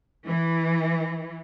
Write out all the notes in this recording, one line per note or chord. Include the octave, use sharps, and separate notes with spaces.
E3